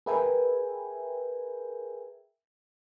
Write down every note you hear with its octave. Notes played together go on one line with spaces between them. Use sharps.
G#4 A#4 B4 E5 G5 G#5